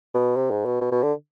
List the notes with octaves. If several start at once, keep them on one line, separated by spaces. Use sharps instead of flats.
B2
C3
G#2
B2
B2
B2
D3